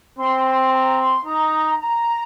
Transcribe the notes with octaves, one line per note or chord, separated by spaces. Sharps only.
C4 C6
C6
A#5
C6
D#4 A#5
A#5